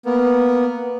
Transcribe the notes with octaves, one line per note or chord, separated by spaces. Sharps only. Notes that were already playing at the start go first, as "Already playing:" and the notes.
A#3 B3